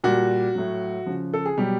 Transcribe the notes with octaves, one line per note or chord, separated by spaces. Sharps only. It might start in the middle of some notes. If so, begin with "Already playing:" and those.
A#2 G3 F#4
A2 F#3
C#3 F3
A4
G#4
B2 F#3 G3 G4